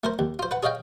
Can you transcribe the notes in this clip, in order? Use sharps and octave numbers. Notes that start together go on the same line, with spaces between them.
A3 A#4 C5
D#2
F4 C5
B4 F#5
G#4 C#5 D#5 F5 G5